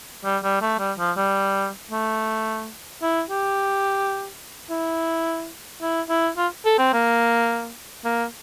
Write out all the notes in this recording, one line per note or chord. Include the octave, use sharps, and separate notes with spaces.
G3
G3
A3
G3
F3
G3
A3
E4
G4
E4
E4
E4
F4
A4
C4
A#3
A#3